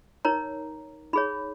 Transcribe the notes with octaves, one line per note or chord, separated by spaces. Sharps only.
D#4 A#4 C#5 A#5
D#4 G#4 C#5 B5